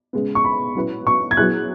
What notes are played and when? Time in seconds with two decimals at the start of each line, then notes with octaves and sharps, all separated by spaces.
0.13 C#3 G#3 B3
0.35 C#6
0.44 B5
0.75 F#3 C#4 E4 B4
1.07 C#6
1.31 G#6
1.37 F#3 B3 E4 G#4 F#6